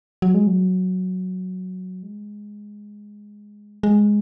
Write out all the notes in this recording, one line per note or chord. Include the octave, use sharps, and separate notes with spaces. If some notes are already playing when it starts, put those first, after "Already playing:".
F#3
G#3
F#3
G#3
G#3